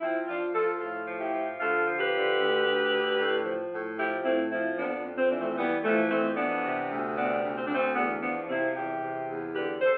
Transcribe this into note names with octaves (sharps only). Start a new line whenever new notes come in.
F3 C4 E4
F3 D4 F4
F3 F4 A4
A2 F4 A4
F3
E4 G4
F3
D3 F4 A4
F3
G4 B4
D3
D2
D2
D3
A2
F3
A2
F3 E4 G4
A2 C4 E4
F3 C4 E4
F2 B3 D4
F2
C4
E3 D4
A3 C4
E3 G3 B3
E3 F3 A3
F2 A3 C4
E3 B3 D4
C3
D2
C3 B3 D4
D2
C4
D2 D4
A3 C4
E2 B3 D4
F3 B3 D4
C3 C4 E4
E2 E4 G4
C3
E2
D3 G4 B4
A4 C5